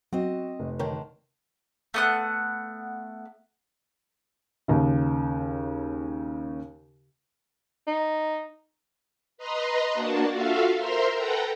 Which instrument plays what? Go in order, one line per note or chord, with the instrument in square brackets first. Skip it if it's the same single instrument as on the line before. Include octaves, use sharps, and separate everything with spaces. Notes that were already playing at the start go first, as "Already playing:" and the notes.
[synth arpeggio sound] F#3 [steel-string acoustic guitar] C4 D#5 [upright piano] F#4
[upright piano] F1
[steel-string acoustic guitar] D3 D#3 [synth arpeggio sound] A#4 C#5 G5
[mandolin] A3 B3 F#5
[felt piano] D#2 C#3
[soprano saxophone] D#4
[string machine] B4 D#5 A#5 C6
A#3 D4 F#4 A5
F4 F#4 A4 E5 F5
A#4 C5 E5 A#5 C6
A4 B4 F#5 G5 A#5